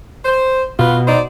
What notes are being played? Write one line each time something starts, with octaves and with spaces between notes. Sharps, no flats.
C5
B2 F4 B4
D#4 C5 D5